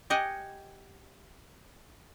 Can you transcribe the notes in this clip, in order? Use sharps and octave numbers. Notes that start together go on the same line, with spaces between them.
G4 D#5 F#5 G#5